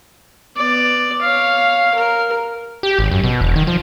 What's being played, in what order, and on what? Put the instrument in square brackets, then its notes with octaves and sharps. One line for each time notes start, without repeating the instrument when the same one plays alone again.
[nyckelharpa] B3 D5
C#5 F5
A#4
[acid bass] G4
G#1
F#2
B2
E1
D#3
F3